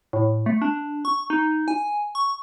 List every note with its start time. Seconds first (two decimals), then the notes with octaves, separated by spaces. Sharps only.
0.13 A2
0.46 A3
0.62 D4
1.05 C#6
1.30 D#4
1.68 G#5
2.15 C#6